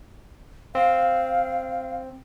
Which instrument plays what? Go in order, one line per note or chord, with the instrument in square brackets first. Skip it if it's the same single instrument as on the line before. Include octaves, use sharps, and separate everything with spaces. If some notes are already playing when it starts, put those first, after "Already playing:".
[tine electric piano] C4 [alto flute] F5